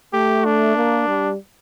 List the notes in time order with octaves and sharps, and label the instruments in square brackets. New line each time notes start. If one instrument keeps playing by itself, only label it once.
[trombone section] A3 [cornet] G4
[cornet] D4
[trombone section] A#3
G3